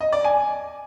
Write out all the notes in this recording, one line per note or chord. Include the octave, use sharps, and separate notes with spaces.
D#5
D5
G#5